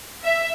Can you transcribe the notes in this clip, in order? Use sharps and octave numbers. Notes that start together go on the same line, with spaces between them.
E5